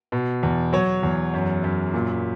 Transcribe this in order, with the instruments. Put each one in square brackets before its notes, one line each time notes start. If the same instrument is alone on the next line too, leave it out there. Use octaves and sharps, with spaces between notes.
[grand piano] B2
E2
F#3 C#5
E2
F#2
F#2
A#2